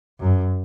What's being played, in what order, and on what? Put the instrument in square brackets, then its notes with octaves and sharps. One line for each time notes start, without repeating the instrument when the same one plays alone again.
[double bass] F#2